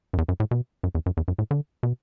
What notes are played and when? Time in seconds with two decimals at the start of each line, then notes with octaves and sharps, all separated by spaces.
0.13 F#2
0.18 E2
0.28 F#2
0.40 A2
0.51 B2
0.83 F#2
0.95 E2
1.06 F#2
1.17 E2
1.28 F#2
1.39 A2
1.51 D3
1.83 B2